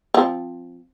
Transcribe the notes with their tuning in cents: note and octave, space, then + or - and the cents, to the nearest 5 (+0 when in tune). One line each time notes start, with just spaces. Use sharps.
F3 +0 C4 +0